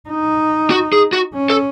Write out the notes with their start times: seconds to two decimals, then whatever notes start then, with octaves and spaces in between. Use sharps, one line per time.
0.09 D#4
0.71 F#4
0.93 G#4
1.13 F#4
1.33 C#4
1.50 A4